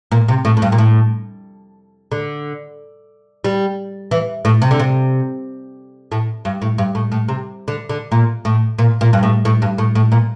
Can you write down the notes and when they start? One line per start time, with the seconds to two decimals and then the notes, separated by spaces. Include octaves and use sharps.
0.12 A#2
0.28 C3
0.45 A2
0.57 A2
0.62 G2
0.72 A#2
0.78 A2
2.12 D3
3.44 G3
4.11 E3
4.45 A2
4.62 C3
4.71 D3
4.79 C3
6.12 A2
6.45 G2
6.62 A2
6.78 G2
6.95 A2
7.12 A2
7.28 C3
7.68 D3
7.89 D3
8.12 A#2
8.45 A2
8.79 A#2
9.01 A#2
9.13 G2
9.23 A2
9.45 A2
9.62 G2
9.78 A2
9.95 A2
10.12 A#2